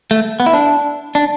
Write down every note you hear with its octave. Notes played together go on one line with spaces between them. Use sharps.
A3
B3
E4
D4
D4